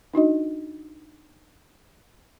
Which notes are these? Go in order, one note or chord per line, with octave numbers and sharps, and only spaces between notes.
D4 D#4 F#4 D#5